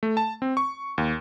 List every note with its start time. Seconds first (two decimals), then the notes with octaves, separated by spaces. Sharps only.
0.03 A3
0.17 A5
0.42 C4
0.57 C#6
0.98 D#2